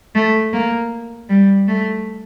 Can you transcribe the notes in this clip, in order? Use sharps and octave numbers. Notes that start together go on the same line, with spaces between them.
A3
A#3
G3
A3